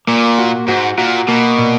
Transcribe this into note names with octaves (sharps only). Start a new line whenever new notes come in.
A#2 A#3
F#4
G#2 F#4
A#2 F#4
B2 A#3
A#2